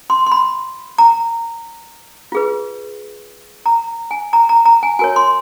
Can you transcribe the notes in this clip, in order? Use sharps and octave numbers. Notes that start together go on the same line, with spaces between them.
C6
C6
B5
A#5
F4 G#4 B4
A#5
G#5
A#5
A#5
A#5
G#5
F#4 A#4 C#5 G#5
C6